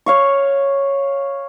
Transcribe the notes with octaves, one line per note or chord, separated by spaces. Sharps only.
C#5 F5 C#6